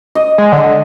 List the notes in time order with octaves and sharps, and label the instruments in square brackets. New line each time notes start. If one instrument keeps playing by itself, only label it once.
[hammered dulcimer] D#5
[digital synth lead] G#3
D3